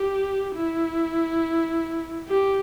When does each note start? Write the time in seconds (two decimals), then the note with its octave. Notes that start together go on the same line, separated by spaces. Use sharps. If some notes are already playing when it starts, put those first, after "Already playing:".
Already playing: G4
0.56 E4
2.28 G4